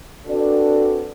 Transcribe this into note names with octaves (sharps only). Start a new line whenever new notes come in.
C4 D4 F#4 A4 B4 D5